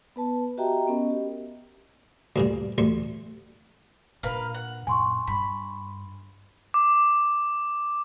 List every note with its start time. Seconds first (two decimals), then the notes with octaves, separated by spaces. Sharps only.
0.16 B3 B4 A5
0.58 F#4 G4 D#5 E5 G5 A#5
0.87 B3 C#4 A#4 D#5
1.10 G4
2.36 D2 G2 A#2
2.78 A1 D2 C6 C#6
4.23 A#2 D4 A#4 B4 F5
4.54 F#5
4.87 F#2 A#2 G#5 C6 C#6
5.28 G2 B5
6.74 D6